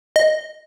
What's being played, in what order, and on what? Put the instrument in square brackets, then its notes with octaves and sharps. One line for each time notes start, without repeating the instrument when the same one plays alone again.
[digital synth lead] D#5